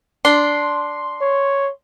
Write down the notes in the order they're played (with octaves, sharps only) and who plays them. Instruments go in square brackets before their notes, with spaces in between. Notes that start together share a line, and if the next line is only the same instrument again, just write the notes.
[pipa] D4 [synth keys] C6
[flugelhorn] C#5